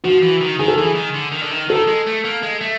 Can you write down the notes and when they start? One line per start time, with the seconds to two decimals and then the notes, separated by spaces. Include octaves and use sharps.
0.04 F3 F#4
0.23 E3
0.41 D#3
0.59 D#3 G#4
0.68 A4
0.76 E3 G#4
0.96 D#3
1.15 D3
1.32 D#3
1.43 D3
1.51 D#3
1.70 D#3 A4
1.88 G#3
2.07 A3
2.24 A#3
2.43 G#3
2.61 A3